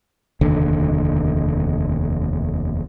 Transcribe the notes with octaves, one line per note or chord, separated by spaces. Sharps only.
F1 D#2 D3